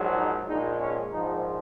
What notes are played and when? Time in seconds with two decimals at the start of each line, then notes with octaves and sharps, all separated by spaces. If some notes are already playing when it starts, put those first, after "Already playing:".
Already playing: A#1 G#2 F#3
0.14 D#4
0.47 A#1 A#2 G#3 D#4
0.79 C#4
1.11 A#1 G#2 F3 D#4